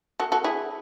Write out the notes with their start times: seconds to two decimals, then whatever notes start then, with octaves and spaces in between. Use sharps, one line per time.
0.20 F#4 A4
0.32 F#4 A4
0.44 E4 G#4